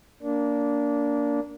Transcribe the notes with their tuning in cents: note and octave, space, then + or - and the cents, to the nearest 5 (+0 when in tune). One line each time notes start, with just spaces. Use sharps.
A#3 +0 D4 -20